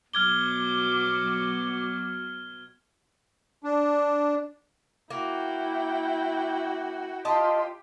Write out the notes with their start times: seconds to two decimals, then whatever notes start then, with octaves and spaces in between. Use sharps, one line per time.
0.13 B2 F#3 D6 F6 G#6 G7
3.64 D4
5.10 A#3 E4 F#4 G5
7.25 F4 G4 D#5 A5 C6